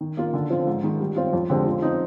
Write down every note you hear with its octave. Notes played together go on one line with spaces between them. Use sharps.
D#3
A#3 F4
D3
F3 C4 F4
G#2
D#3 G#3
G3
C4 F4
F2
D3 G#3 C4 G4
F3
C4 D#4